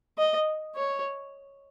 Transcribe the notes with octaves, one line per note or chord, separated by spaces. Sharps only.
D#5
C#5